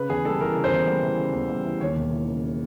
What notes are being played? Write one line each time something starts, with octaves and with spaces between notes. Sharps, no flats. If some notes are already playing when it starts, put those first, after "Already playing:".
Already playing: C#3 B4
E2 G#4
G3 A4
E3 A#4
C#3
C5
E2
G3
E3
C#3
E2
G3
E3
D#2 C#5
E1
E3
C#3